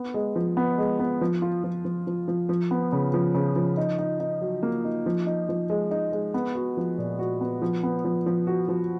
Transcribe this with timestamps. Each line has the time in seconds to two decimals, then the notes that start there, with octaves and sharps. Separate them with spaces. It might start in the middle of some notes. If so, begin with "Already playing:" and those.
Already playing: B3
0.14 G#3
0.36 F3
0.57 B3
0.78 G#3
0.99 B3
1.21 F3
1.42 F4
1.64 F3
1.85 F3
2.07 F3
2.28 F3
2.49 F3
2.71 B3
2.92 C#3
3.14 F3
3.35 C#3
3.56 F3
3.77 D#4
3.99 D#4
4.20 D#4
4.42 F#3
4.63 A#3
4.84 D#4
5.06 F3
5.27 D#4
5.49 F3
5.70 G#3
5.91 D#4
6.12 G#3
6.34 B3
6.55 F#4
6.77 F3
6.98 A#2
7.19 F#4
7.41 B3
7.62 F3
7.83 B3
8.04 F3
8.26 F3
8.47 F#4
8.69 F3